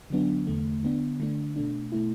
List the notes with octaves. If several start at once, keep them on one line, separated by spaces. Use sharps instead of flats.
D3 F#3 B3 D4
E2 D3 A3
D3 B3 D4
D3 A3 D4
B2 A3 D4
B2 A3 E4